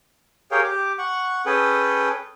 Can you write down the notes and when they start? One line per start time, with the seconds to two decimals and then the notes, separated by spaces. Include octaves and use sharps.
0.51 G4 G#4 A#4 C#5 F5 G5
0.64 G4 D6
0.98 F#5 C#6
1.46 C#4 G#4 A4 B4 G5